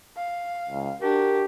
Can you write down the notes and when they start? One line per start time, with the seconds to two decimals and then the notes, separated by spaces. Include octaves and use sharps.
0.16 F5
0.70 C#2
1.02 D4 F#4 G4 A#4